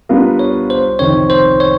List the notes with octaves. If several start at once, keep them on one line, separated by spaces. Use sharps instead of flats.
G3 B3 D4 F4 A#4
C#5
C5
F2 C3 D#3 C#5
C5
C#5